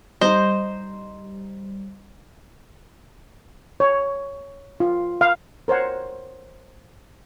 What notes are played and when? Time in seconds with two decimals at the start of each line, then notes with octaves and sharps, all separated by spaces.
0.21 G3 D#4 C5 D#5
3.80 C#5
4.80 F4
5.21 F5
5.68 A#4 C5 C#5 F#5